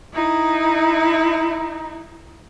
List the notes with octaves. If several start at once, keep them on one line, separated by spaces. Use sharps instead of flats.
D#4 E4